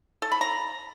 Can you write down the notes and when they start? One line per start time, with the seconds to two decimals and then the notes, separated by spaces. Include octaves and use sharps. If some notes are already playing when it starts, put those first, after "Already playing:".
0.22 A4
0.32 B5
0.41 A#5